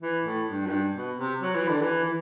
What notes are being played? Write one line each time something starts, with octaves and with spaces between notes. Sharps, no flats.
E3
A2
G2
F#2
G2
B2
C3
F#3
E3
D3
E3
E3